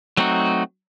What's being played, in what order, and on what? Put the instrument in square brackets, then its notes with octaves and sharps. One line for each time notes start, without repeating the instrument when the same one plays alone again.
[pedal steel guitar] F#3 A3 C4 D#4 F#4